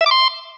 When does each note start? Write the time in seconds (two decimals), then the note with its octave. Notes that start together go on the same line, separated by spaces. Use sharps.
0.01 E5
0.06 D6
0.11 C6